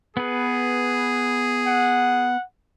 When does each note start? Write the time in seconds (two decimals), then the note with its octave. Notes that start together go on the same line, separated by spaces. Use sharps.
0.17 B3 G#4 B4
1.67 F#5